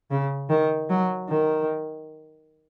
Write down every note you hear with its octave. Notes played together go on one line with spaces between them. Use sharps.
C#3
D#3
F#3
D#3